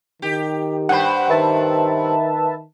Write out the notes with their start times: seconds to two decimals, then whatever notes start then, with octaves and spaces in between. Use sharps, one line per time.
0.22 D#3 G4
0.89 G2 C5 F#5 G5 B5
1.30 D#3 B4 E5 A5